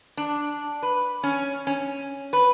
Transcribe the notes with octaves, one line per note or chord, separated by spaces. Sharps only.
D4
B4
C#4
C#4
B4